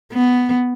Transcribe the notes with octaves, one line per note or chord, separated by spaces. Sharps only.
B3